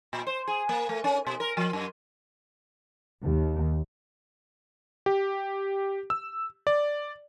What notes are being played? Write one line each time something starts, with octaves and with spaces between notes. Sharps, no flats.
A#2
C5
G#4
A#3
A3
C#4
B2
A#4
F3
F#2
D#2
G4
E6
D5